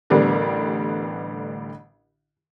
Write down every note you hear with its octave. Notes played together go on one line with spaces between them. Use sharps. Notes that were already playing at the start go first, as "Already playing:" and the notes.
A1 D3 G3 B3 D4 A#4